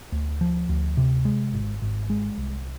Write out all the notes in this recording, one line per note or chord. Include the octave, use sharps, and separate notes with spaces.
D2
F3
D2
C3
G#3
G#1
G#1
G#3
C2